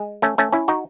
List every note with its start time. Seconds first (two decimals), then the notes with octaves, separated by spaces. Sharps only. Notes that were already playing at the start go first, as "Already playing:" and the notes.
Already playing: G#3
0.22 A3 C#4
0.38 A3 C#4
0.52 C#4 E4
0.68 D#4 F#4